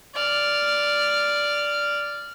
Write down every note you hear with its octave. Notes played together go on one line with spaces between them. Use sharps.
D5 F6